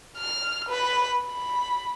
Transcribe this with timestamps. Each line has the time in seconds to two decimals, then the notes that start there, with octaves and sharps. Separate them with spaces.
0.17 F6
0.69 B4
1.24 B5